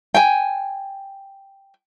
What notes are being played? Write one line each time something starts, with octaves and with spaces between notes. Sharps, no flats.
G5 G#5